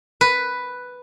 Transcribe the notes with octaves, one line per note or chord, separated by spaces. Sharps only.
B4